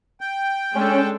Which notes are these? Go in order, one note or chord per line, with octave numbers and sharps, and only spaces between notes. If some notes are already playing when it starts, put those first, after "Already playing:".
G5
G#3 C#4 D4 A4